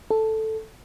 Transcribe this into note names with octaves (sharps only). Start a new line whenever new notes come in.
A4